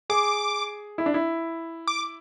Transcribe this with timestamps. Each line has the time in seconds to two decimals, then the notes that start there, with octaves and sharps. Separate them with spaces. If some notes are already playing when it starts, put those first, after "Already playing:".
0.10 G#4 D6
0.98 E4
1.06 D4
1.14 E4
1.87 D6